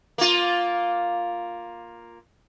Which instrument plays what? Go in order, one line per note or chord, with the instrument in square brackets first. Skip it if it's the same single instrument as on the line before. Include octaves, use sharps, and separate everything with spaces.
[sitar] A#3 F4